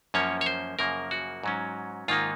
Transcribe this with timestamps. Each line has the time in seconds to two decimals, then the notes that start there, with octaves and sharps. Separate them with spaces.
0.14 F#2 F3 A#3 C#4 C#5
0.41 C#5
0.46 C5
0.79 F#2 C#3 F3 A#3 A#4
1.11 F#4
1.44 G#2 F#3 C#4
2.08 G#2 D#3 A#3 D#4 F4